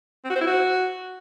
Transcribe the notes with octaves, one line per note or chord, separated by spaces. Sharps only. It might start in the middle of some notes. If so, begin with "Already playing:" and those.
C4
F#4
C5
E4
F#4